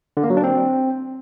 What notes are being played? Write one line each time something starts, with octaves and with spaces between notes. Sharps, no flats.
D3
A#3
F#3
D4
C4